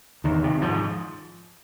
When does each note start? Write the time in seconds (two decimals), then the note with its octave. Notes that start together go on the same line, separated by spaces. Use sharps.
0.24 E2 D#3
0.44 C3
0.61 G#2 F3